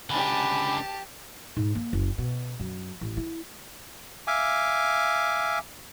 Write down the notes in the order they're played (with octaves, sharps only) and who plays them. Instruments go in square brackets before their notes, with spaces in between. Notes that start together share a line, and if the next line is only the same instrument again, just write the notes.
[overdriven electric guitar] C#2 D3 [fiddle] G4 A5 [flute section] G#5 B5
[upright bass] G#2
A#3
F#1
B2
F#2
A1
E4
[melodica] E5 F5 G#5 D6